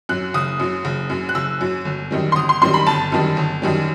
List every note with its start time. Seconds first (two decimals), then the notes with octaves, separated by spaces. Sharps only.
0.09 F#2 F#3 F#6
0.34 F#1 D#6
0.59 F#2 F#3
0.85 F#1
1.10 F#2 F#3
1.29 F#6
1.35 F#1 E6
1.61 F#2 F#3
1.85 G1
2.11 F#2 D#3 G3
2.32 C6
2.36 G1 D#6
2.49 C6
2.62 F#2 D#3 G3 C6
2.74 B5
2.87 G1 A5
3.12 F#2 D#3 G3
3.37 G1
3.62 F#2 D#3 G3